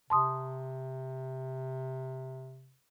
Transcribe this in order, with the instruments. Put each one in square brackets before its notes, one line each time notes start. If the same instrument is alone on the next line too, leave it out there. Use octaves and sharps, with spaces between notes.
[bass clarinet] C3 [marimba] A5 C6 D#6